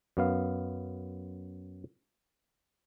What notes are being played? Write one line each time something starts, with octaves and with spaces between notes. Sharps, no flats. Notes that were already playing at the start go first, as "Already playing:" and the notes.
F#2 B3 F5